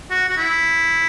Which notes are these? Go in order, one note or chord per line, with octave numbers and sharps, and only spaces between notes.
F#4
F#4
E4